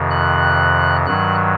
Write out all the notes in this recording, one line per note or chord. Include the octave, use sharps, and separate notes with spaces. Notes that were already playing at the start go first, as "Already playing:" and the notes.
Already playing: F2 C3 D#3
F#6
G2 D#3 F#3 F#6